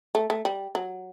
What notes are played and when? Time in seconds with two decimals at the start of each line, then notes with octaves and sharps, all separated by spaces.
0.15 A3
0.30 A3
0.45 G3
0.75 F#3